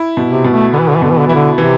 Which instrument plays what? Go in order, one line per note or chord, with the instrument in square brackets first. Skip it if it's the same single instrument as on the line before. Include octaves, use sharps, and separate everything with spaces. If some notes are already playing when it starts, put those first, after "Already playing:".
Already playing: [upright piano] E4
B2
[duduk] C3
[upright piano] B2
[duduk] A3
[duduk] D3 [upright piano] B3
[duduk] E3
D3
E3
[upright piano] B2 [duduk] D3
[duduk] E3
D3
[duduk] E3 [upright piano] E4
[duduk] D3
[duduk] C3 [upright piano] E3